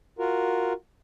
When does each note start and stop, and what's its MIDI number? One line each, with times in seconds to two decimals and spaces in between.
0.19 0.73 65
0.19 0.73 66
0.19 0.73 70